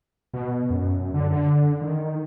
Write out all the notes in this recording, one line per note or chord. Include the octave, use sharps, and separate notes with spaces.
B2
F#2
D3
D3
D#3